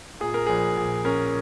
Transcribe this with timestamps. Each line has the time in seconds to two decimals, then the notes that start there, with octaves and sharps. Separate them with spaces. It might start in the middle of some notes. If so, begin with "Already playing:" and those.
0.20 A#2 G#4
0.34 A#4
0.46 A#1 G#4
0.77 A#1
1.05 C#4 A#4